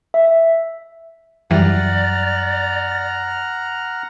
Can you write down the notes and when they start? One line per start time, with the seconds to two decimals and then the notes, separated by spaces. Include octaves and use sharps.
0.14 E5
1.51 F#2 E3 G3 D5 F#5 A#5 F6